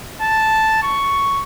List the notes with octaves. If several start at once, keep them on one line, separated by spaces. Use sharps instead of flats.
A5
C#6